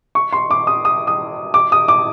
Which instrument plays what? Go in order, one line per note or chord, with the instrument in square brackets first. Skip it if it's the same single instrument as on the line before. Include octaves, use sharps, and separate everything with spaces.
[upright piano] C#6
C6
D6
D#6
D#6
D#6
D6
D#6
D6